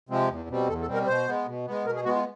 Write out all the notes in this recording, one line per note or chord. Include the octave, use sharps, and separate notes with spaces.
C3 F3 G#3 C4
E2
B2 G3 C4
E2 A4
A4
B2 G3 C4
A#4
B2 C5
G#3 B3
B2
G#3 B3
B2 A#4
G#4
G#3 B3 F#4
F4